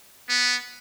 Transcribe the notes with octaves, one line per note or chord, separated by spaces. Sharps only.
B3